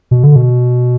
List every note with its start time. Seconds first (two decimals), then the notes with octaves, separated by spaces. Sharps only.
0.11 B2
0.24 D3
0.36 B2